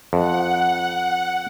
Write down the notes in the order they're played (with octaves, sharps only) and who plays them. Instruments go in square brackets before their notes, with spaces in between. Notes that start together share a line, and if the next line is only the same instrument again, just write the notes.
[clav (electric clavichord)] F2 [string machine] F#5